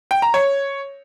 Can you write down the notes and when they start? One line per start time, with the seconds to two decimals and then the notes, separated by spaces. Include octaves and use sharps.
0.11 G5
0.22 A#5
0.34 C#5